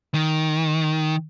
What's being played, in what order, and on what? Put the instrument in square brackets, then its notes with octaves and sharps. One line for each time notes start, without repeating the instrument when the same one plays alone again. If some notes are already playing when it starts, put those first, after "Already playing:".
[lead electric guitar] D#3